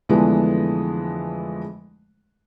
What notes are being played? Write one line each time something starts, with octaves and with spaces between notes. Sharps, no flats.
F2 D3 E3 G#3 A3 B3